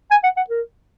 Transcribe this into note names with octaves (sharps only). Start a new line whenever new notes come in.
G#5
F#5
F#5
A#4